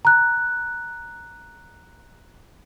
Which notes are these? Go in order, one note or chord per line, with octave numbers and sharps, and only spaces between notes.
A#5 F#6